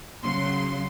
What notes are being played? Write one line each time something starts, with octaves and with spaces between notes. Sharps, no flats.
C#3 F#3 C6